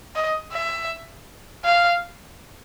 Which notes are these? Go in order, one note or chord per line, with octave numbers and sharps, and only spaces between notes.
D#5
E5
F5